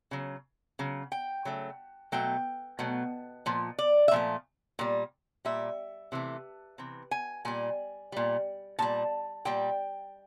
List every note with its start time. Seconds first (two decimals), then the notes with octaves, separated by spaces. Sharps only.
0.11 C#3 F#3
0.79 C#3 F#3
1.12 G5
1.45 C#3 F#3 A3
2.12 B2 F#3 A3 G5
2.79 B2 F#3 A3
3.46 A#2 F3
3.79 D5
4.08 E5
4.11 A#2 F3 A3
4.79 A#2 G3
5.45 A#2 G3 E5
6.12 C3 E3 A3
6.78 C3 E3
7.11 G#5
7.45 A#2 G3 G#5
8.12 A#2 G3
8.79 A#2 G3 A5
9.45 A#2 G3 G5